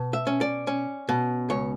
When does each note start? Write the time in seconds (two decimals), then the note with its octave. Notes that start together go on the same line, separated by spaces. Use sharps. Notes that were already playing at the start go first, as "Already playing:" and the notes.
Already playing: B2
0.13 E5
0.27 C#4
0.41 D5
0.67 C#4
1.09 B2
1.50 C#2 C#5